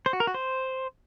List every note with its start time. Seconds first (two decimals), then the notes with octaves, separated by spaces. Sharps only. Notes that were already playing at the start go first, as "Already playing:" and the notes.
0.06 C5
0.13 F#4
0.20 A#4
0.27 F#4
0.34 C5